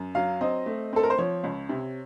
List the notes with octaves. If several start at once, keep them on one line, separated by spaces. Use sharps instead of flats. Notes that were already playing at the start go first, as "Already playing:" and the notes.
Already playing: F#2
F#3 F5
C4 D#5
A3
C4 A4
A#4
C5
F3 C#5
C#2
C3